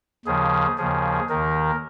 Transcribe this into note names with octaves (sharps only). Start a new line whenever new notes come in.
D#2 C#3 F3 G#4
D#2 C#3 F3 G#4
D#2 D#3 A#4